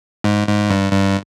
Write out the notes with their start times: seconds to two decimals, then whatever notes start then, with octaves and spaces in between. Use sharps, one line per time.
0.24 G#2
0.47 G#2
0.70 G2
0.92 G2